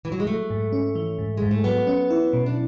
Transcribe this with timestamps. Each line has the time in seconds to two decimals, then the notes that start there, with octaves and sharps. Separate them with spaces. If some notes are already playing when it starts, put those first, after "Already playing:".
0.05 E3
0.12 F#3
0.20 G#3
0.27 F#3 A3
0.50 G#2
0.72 C#4
0.95 E3
1.19 G#2
1.37 G#2 G#3
1.51 A3
1.64 F#3 B3
1.87 C#4
2.11 E4
2.33 B2
2.46 D4